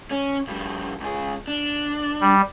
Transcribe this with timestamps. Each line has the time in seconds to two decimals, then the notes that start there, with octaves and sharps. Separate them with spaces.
0.11 C#4
0.48 F2 G3
1.00 C#2 G#4
1.47 D4
2.21 G3